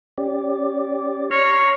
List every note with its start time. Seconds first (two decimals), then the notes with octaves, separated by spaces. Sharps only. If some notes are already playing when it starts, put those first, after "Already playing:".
0.18 C#4 G4 D5
1.31 C#5 A#5 C6 F6